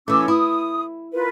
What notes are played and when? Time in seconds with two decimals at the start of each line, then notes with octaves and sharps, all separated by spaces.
0.08 E3 A3 C#4 D6 E6
0.28 E4 D#6
1.12 F4 A#4 B4